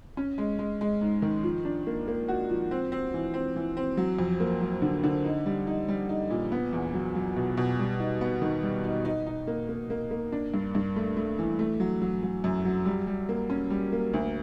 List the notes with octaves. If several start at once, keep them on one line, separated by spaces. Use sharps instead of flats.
C#4
G#3
G#3
G#3
G#2
D#3
F3
D4
A#3
A#3
F#4
F3
C4
C4
E3
C4
E3
C4
F#3
F2
A#3
F#3
D3
D3
D#4
G3
D#4
G3
D#4
A#2
B3
E2
F#3
F#3
B2
B2
G3
D#4
B3
D#3
G3
D#4
D#4
D#4
A#3
A#3
A#3
A#3
D4
G2
G2
A3
A3
E3
A3
F#3
F#3
F#3
F#2
F#3
G3
G3
A#3
C#4
G3
A#3
D2